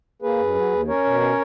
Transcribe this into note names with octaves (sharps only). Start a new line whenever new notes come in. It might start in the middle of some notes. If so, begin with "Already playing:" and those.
A#3 G#4 B4
F#2
F#3
D#2
C#4 A#4 C#5
B2
C#4